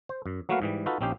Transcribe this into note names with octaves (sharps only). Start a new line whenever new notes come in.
C5
F#2
F#3 A3 A#3 F#4 B4 F5
G#2 E3 G3
D#4 F4 F#4 A4 B4
A#1 C4 C#4 D#4 G4 C5